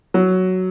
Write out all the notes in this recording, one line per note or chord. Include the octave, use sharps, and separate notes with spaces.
F#3